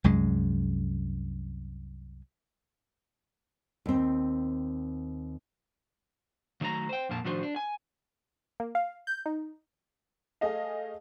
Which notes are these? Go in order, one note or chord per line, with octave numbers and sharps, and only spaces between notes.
C2 F#2 G#3
D#2 C4
D#3 F#3 A3 C#5 A#5
C5 G5
F2 A#2 A#3 A5
A2 D#3 F3 D4 F#4 C5
D4
G#5
A#3
F5
G6
D#4
A3 G#4 D#5 F5